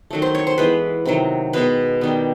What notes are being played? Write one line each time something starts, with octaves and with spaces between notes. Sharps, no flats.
D#3 F#3 A3
C5
C#5
C5
E3 G#3 B3 B4
C3 D#3 F#3
B2 G#3 B3 B4
D#3 G3 B3